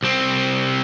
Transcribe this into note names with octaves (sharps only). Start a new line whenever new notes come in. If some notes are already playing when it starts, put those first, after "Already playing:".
C2 C4